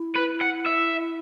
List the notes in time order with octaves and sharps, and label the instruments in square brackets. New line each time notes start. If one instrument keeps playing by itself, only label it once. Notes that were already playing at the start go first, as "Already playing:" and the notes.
Already playing: [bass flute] E4
[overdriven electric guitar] B4
F#5
E5